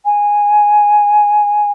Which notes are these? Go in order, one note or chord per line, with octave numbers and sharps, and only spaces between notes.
G#5